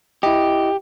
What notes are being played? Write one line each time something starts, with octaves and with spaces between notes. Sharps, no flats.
E4 G4 D#5